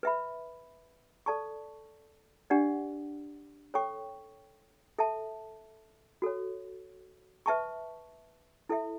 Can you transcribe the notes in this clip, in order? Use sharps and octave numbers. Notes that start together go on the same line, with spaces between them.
B4 E5 B5
A4 D5 A5 C#6
D4 G4 D5 F#5
A4 C#5 G5 C#6
A4 E5 A5
F#4 A4 C#5
B4 E5 A5 C#6
E4 A4 E5